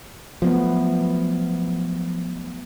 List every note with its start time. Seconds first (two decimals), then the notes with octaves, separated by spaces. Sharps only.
0.42 F3 F#3 A3 B3